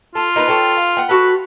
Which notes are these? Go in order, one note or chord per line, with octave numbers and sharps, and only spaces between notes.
F4 A4
D#4 A#4 B4
A4 C#5 G5
F5
F#5 G5
F#4 A4 B4